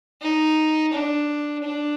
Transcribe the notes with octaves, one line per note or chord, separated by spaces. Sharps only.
D#4
D4
D4